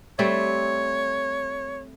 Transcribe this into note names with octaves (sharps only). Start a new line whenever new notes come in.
G3 A3 C4 C#5